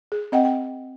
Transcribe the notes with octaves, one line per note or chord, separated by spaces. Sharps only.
G#4
C4 D#5 F#5 G5
G5